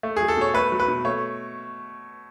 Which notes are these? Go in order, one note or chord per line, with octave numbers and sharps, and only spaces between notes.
A3
F#3 G#4
A4
B2 C#5
A3 B4
F#3
B4
B2
A3 C#5